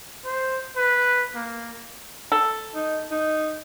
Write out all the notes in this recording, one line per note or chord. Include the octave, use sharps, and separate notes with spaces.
C5
B4
A#3
A4
D#4
D#4